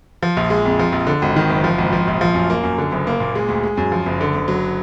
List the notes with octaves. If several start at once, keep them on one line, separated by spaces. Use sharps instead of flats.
F3
A#1
G#3
F2
F3
A#1
D3
G#1
D#3
F#1
F3
G#1
F3
A#1
F3
F#2
A#3
F#2
D3
F#1
A#3
A#2
G#3
D2
G#3
F#2
F3
F#1
D3
F#1
F#3